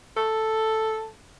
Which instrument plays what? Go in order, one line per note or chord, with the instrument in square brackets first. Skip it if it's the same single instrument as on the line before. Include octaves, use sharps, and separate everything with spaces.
[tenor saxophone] A4